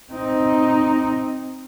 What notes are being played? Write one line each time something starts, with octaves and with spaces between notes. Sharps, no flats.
C4 D#4